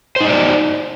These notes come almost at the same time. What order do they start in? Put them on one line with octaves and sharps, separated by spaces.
C5 D#4 D#5 D5